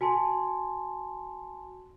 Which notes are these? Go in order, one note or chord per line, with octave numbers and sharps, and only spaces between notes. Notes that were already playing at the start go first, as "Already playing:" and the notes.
F#4 G#5 A5 C6